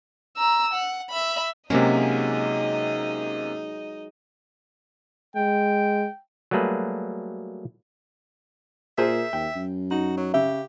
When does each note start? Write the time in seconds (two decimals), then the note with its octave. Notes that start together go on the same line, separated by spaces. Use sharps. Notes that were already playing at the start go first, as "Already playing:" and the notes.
0.37 A#5 E6
0.73 F#5
1.10 E5 B5
1.70 C3 F#3 G#3 A#3 C#4 D#4 D#5
5.36 G#3 G5
6.51 F#3 G3 A3 A#3 G#4 B4
8.98 A#2 G#4 A#4 C5 E5
9.33 D#2 G5
9.55 F#2
9.91 D#4 F#4
10.17 F#3
10.34 C#3 G4 E5